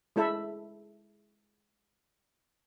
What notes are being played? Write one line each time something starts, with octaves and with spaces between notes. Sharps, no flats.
G#3 E4 A4 E5 B5